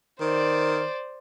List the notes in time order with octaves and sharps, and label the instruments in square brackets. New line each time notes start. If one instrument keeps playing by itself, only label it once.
[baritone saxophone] D#3 [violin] C5 D5